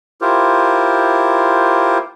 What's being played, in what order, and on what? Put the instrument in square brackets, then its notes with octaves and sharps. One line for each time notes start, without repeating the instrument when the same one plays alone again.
[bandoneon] E4 F4 G4 A#4 C5